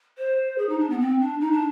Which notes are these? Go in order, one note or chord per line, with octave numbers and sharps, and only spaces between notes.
C5
G#4
D#4
D4
B3
C4
D4
D#4
D4